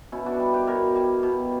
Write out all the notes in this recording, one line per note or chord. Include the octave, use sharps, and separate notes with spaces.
B2 C#4 E4
D4 F#4
G3
G4 B4
B2 A#4 C#5
G3
B2